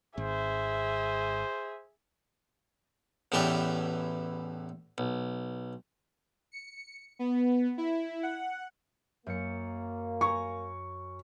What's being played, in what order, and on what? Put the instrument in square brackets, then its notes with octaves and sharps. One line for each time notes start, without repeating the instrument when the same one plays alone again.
[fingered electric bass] G#1 [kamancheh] G#4 E5 [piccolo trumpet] C5
[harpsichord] A1 E2 A2 E3 G4 D5
B1
[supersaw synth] C#7
B3
E4
F#5
[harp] F#2 C#7 [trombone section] A#3
[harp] G#5 A#5 [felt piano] C#6